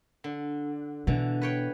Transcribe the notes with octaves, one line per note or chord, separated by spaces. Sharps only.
D3
B2 D3 E3
B4 C#5 G5